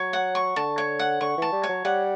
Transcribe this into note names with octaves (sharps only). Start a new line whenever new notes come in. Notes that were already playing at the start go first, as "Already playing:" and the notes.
Already playing: F#3 C#5
F#5
C#6
D3 A5
C#5
F#5
D3 C#6
E3 A5
G3
C#5
F#3
G3 F#5